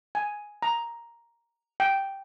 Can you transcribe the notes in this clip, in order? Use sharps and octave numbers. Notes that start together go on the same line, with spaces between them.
G#5
A#5
G5